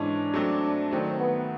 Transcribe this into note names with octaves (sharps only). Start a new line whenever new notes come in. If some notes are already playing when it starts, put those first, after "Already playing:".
Already playing: G#2 E3 G#3 C#4 D4
F#3 A3 C4
D#3 F#3 A3 C4
B3